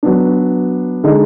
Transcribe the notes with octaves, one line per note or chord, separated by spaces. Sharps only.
F#3 B3 D4
D3 G#3 D#4